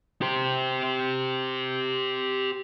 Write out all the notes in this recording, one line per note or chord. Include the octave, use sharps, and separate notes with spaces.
G4 C5